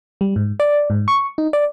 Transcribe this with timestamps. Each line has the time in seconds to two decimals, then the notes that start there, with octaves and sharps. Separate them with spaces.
0.21 G3
0.36 G#2
0.60 D5
0.90 G#2
1.08 C#6
1.38 D#4
1.53 D5